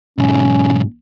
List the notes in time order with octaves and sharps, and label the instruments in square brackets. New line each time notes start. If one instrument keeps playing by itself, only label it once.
[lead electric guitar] B1 G#2 [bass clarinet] C#4